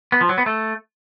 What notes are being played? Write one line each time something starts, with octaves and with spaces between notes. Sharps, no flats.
B3
F3
F#3
B3
A3